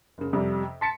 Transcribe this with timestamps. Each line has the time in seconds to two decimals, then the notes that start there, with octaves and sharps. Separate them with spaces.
0.18 F#1 C#3
0.33 F2 C3 G3
0.81 A5 C6 B6 C#7